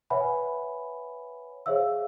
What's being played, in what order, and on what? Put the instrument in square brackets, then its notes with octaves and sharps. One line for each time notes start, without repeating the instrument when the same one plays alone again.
[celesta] B4 C#5 E5 F#5 G#5 B5
G#4 C5 C#5 E5 F5 E6